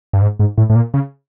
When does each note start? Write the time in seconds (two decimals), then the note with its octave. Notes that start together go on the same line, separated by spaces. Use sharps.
0.13 G2
0.22 G#2
0.40 G#2
0.58 A2
0.70 A2
0.75 A#2
0.94 C#3